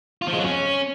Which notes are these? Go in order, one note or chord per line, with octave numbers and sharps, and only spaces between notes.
F4
F3
G#3
F#3
C#4